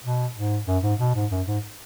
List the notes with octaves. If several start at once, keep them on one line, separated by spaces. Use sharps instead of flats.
B2
G#2
F#2
G#2
B2
G#2
F#2
G#2